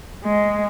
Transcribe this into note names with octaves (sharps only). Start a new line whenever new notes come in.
G#3